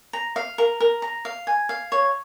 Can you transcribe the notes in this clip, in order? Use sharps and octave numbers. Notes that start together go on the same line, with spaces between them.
A#5
F5
A#4
A#4
A#5
F5
G#5
F5
C#5